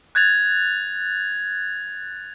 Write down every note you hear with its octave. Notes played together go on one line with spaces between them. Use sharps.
F#6 G#6 A6 F7